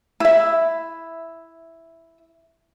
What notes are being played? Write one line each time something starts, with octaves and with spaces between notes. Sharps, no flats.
E4 E5